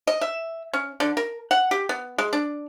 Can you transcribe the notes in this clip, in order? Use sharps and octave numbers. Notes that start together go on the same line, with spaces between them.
D#5
E5
C#4
D3
A#4
F#5
G4
B3
G#3
D4